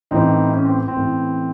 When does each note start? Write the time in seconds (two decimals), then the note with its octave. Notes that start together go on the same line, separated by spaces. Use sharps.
0.11 A1 A2 E3 C4 D#4
0.53 C#4
0.65 C4
0.88 C4
0.96 A1 A2 E3